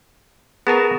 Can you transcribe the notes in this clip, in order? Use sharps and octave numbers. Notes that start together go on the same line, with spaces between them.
B3 G#4 A#4 A5 A#5